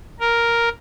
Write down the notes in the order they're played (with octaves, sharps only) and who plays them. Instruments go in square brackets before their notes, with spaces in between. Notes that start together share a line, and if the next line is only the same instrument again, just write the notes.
[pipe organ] A#4